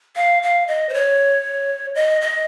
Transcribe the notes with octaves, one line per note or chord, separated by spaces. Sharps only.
F5
F5
D#5
C5
C#5
D#5
D#5